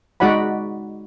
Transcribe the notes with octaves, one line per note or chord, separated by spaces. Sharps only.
G#3 D#4 F#4 D5 F#5 B5